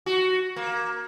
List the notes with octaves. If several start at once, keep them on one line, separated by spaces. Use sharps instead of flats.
F#4
A#3